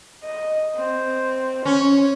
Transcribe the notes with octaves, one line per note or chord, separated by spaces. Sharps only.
D#5
C4
C#4 C#5